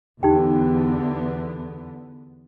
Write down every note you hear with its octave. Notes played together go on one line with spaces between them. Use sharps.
E2 D3 B3 D#4 G4 G5